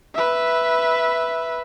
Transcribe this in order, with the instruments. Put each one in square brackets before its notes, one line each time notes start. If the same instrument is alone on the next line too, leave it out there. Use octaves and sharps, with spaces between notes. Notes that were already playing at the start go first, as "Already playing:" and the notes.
[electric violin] B4 E5